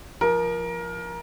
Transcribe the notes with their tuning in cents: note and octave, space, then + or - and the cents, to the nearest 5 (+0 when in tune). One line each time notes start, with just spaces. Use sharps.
F3 -10 A#4 +20